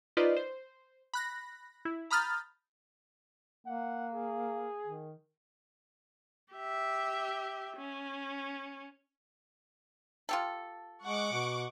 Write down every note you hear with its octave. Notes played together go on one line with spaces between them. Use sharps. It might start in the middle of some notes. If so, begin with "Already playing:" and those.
D#4 F4 B4 C5 D5 D#5
C5
B5 F#6 A#6
E4
A#5 B5 D#6 F6 G6 A6
A#3 F#5
G#4
D#3
G4 E5
C#4
F4 G4 A4
G#3 F#5 C#6 D6
B2